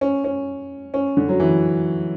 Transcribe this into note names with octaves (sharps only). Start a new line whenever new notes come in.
C#4
C#4
C#4
D3
F#3
E3